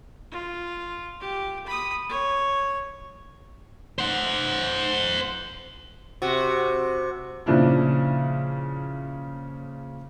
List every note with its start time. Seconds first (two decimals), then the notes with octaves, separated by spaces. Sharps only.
0.31 F4
1.20 G4
1.66 B5 D#6
2.09 C#5
3.99 C5 F#5
6.22 C3 F#4
7.46 A#2 C#3 F3 D4 E4